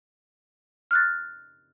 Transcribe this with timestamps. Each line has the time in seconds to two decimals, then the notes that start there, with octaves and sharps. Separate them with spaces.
0.91 F6 F#6 A6